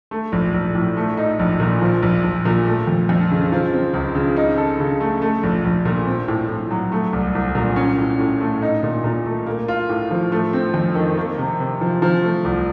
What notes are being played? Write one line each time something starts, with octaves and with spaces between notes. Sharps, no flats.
A3
A#1
A#1
A2
A3
D#4
A#1
A#2
F3
A#1
A#1
A#2
A3
F2
F2
C#3
F3
C4
C#2
C#3
D#4
A4
C#3
A3
A3
A#1
A#1
A#2
C4
A2
A2
F#3
A3
C2
C2
A#2
C#4
A2
A2
A3
D#4
A#2
A#2
A3
A#3
F4
A2
F3
A3
C4
F2
D#3
A#3
C3
C3
F3
F3
A3
C2